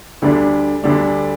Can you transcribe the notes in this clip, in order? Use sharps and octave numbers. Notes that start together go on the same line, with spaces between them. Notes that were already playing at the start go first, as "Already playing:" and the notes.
D2 D3 G3 D4
D2 D3 G3 D4